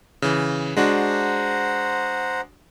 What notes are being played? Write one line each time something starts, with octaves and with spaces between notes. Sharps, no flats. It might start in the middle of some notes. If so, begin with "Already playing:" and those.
C#3 E3
G#3 D4 F#4 C5 F#5 A#5